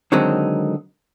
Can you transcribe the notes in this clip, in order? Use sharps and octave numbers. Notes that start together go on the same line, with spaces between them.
D3 D#3 F#3 G#3 C4 D#4